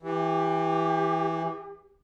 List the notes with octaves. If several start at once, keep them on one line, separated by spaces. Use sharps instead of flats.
E3 G4